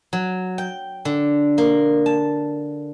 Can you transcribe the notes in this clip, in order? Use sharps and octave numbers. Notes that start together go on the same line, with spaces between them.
F#3
G5
D3
A#3
A5